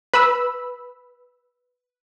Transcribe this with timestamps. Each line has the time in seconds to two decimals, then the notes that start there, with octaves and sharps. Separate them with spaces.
0.14 B4 B5 E6